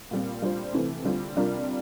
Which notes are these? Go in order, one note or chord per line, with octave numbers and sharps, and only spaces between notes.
A#2 G3 C4
G3 D4 F4 C5
C3 E3 A3 C4
D3 G3 C4 F4
C3 G3 D4 F4 A#4